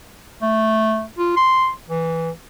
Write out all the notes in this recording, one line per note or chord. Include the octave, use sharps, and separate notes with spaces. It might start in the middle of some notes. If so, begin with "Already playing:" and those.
A3
F4
C6
E3